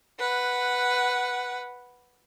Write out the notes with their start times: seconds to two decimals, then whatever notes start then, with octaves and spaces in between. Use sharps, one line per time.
0.19 B4 F#5